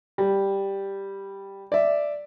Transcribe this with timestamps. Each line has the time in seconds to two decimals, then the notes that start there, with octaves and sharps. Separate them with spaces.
0.18 G3
1.72 D5 E5